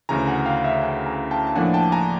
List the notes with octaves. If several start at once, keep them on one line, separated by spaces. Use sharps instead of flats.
D2 C#3 E3 G#5 A#5
F#5 G#5
F5 G5
E5 F#5
F#5 G#5
G#5 A#5
G5 A5
A5
A2 F3 A#3 D4 F#5 G#5
G5 A5
G#5 A#5